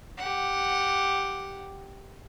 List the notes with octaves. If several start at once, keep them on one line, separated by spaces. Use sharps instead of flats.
G4 F#5